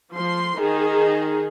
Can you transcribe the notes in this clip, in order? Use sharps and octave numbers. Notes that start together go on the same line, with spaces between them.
F3 C6
D#3 D#4 G#4